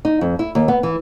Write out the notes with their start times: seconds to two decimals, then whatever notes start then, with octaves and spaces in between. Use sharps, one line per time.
0.05 D#4
0.21 F2
0.39 E4
0.55 D#2
0.68 B3
0.83 E3